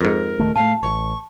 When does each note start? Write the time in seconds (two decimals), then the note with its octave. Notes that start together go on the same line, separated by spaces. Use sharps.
0.01 F2 G#2 A#4
0.39 D#1 D#3 A3
0.56 A2 A3 F5 A5
0.83 A1 C#6